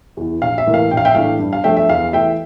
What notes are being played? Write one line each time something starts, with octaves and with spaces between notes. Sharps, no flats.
E2 E3
A#1 F5
E5
A2 E3 A#3
F5
A#1 G5
F5
E5 G5
A2 E3 A3 D4 F5
G2
F5
F3 A3 D4 E5 G5
E5
E2 F5
E3 A3 E5 G5